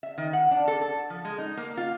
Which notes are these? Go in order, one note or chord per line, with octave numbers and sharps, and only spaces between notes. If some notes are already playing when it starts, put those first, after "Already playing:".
E5
D#3
F#5
D4
A4
A4
F3
G#3
D#4
A#3
F4